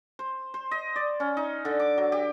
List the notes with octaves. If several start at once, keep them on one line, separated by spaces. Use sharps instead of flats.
C5
C5
D#5
D5
C#4
D#4
D3
D6
F#3
G4